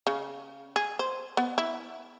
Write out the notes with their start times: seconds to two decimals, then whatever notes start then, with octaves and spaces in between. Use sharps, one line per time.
0.07 C#3
0.76 G#4
0.99 C5
1.37 B3
1.58 E4